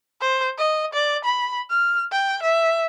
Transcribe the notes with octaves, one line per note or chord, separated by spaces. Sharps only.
C5
D#5
D5
B5
F6
G5
E5